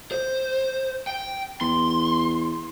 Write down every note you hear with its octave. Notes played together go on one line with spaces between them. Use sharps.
C5
G5
E2 C6